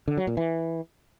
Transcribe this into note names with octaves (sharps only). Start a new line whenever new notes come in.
D3
F#3
A#2
E3